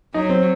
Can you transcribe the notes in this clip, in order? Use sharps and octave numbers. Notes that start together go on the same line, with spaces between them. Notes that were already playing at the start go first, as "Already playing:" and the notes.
F#3 D#4
C4